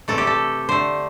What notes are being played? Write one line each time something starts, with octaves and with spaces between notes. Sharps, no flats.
C3 E3 A3 A4
G4
A4
D3 A3 C5